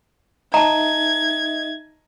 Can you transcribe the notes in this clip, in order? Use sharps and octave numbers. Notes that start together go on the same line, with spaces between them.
D#4 D#5 E5 A5 A#5 G#6